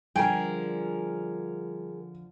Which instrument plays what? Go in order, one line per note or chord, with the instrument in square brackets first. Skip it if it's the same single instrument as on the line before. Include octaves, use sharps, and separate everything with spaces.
[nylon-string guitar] D3 F3 [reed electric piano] G3 [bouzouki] G#4 A#4 [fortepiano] G5